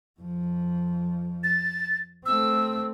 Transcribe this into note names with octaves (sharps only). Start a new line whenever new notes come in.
F2 F3
A6
A3 C4 E6